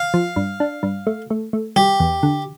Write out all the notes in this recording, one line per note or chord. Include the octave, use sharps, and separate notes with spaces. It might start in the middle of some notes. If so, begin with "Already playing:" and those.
Already playing: F5
F3
G2
D4
G2
A3
A3
A3
G3 G4
E2
D3